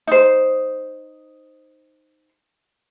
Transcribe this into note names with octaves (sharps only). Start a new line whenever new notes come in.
D#4 C5